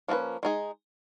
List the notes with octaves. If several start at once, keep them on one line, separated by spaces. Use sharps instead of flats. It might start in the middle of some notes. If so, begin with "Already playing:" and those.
F3 A#3 C#4 F#4 B4
G#3 D#4 G#4